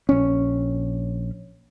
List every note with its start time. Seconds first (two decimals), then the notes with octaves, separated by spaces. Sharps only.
0.09 A#1 C#4